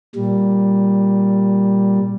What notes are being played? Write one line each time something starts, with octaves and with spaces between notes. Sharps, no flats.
A#2 G3